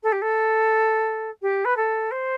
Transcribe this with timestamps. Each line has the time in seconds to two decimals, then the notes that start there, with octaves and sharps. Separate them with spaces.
0.03 A4
0.12 G4
0.21 A4
1.42 G4
1.65 B4
1.76 A4
2.11 C5